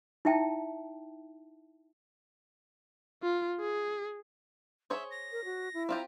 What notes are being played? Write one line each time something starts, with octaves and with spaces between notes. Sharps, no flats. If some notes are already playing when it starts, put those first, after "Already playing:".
D#4 E4 E5 G5 A5
F4
G#4
G#4 C5 C#5 E5
A#6
A#4
F#4
E4
C4 F4 G4 A#5